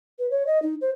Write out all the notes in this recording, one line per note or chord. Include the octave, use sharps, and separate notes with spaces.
B4
C#5
D#5
D#4
C5